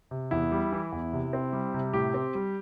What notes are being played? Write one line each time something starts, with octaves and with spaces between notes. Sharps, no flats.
C3
E2 E4
G3
E3
E2
C3
C4
G3
C3
A2 G4
C4
G3